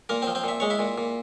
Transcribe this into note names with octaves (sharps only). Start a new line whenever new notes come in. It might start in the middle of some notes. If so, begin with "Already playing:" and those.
A#2 A#3 A#4
C4 C5
F3
C4 C5
A#2 E5
G#3 C#5
E4 E5
A#2
A#2